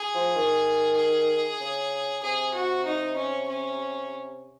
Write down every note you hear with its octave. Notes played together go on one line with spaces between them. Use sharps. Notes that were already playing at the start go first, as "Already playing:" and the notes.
Already playing: G#4
F3
D#3
G#4
C#3
C3 G#4
F#4
D#4
C#4
C#4